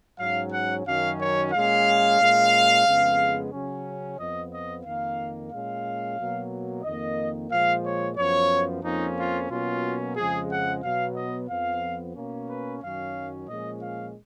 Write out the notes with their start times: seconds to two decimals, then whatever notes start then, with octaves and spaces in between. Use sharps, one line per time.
0.19 G#2 F#3 C#4 F5
0.52 F#5
0.86 F#2 D#3 F#3 C#4 F5
1.20 C#5
1.53 A#2 G#3 C#4 F5
2.19 A#2 G#3 C#4
2.86 F2 C#3 G#3 B3
3.52 C#3 F#3 C#4
4.18 F2 F3 B3 D#5
4.52 D#5
4.85 F2 D#3 A#3 F5
5.51 A#2 G#3 C#4 F5
6.18 B2 F#3 A#3
6.83 F2 D#3 A#3 D#5
7.50 A#2 F3 G#3 F5
7.84 C#5
8.17 F#2 F3 B3 C#5
8.83 F2 F3 A#3 C#4 D#4
9.17 F4
9.49 B2 F#3 A#3 C#4 F4
10.16 F2 C#3 F3 G#3 G#4
10.50 F#5
10.83 B2 F#3 B3 F5
11.15 D#5
11.49 F2 F3 B3 F5
12.16 B2 A#3 C#4
12.49 B4
12.82 F#2 D#3 F#3 C#4 F5
13.48 A#2 F3 G#3 C#4 D#5
13.82 F5